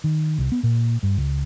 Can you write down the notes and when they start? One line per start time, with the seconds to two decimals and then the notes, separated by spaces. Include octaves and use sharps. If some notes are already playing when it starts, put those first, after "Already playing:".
0.04 D#3
0.38 C2
0.52 B3
0.63 A#2
1.03 G2
1.17 C#2